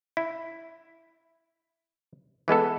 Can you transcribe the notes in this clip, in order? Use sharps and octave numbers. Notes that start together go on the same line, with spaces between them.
E4
E3 G#3 B3 A4